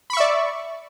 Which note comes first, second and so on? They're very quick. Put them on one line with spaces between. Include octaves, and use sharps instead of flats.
B5 C#6 E5 D5